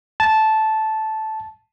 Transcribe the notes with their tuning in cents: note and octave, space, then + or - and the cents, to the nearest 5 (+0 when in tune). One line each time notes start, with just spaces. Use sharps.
A5 -10